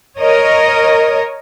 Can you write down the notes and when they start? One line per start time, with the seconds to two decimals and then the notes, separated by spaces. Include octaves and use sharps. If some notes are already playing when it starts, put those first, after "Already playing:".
0.20 A#4 C#5 D#5